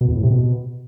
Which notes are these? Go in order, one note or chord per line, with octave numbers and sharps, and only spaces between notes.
B2
E2
A2
C3
B2